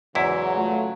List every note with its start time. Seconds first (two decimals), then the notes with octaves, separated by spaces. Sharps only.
0.15 E2 G#2 C#3 F#3 E4
0.56 A3 F4